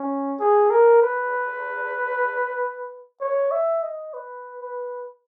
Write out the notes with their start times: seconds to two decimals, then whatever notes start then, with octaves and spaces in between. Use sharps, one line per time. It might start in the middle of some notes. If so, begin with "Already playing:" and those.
Already playing: C#4
0.40 G#4
0.70 A#4
1.02 B4
3.21 C#5
3.51 E5
3.83 D#5
4.14 B4
4.61 B4